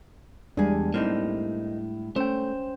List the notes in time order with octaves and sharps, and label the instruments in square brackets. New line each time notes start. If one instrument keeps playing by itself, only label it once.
[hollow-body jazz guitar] E2 G#4 [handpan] G3 G#3 D4
[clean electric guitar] A2 [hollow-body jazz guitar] A#3 C4 D#4
[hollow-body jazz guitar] A3 [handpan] C#4 [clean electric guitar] C5 G5